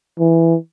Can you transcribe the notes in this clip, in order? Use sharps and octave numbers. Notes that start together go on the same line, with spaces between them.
E3